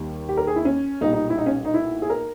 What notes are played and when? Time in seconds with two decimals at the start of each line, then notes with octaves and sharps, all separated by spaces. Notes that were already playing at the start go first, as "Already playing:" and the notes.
Already playing: D#2 D#3 G3
0.29 G4
0.37 A#4
0.47 G#4
0.56 E4
0.65 C#4
1.01 B1 A#2 G3 D#4
1.13 D#4
1.30 E4
1.38 D#4
1.46 C#4
1.65 D#4
1.74 E4
2.02 G#4
2.10 A#4